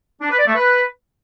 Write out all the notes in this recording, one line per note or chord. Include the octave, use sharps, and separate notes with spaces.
D4
B4
D5
A3
B4